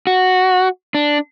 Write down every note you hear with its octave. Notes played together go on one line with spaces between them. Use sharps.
F#4
D4